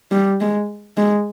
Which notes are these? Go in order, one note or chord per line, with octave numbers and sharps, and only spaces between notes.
G3
G#3
G#3